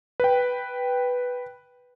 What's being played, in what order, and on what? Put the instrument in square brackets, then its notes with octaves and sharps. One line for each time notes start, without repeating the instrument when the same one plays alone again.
[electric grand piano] B4 G5